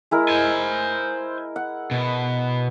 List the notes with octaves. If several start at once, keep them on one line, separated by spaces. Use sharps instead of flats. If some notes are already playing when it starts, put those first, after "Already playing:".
G#3 E4 A#4
C5 G#5
F#5
B2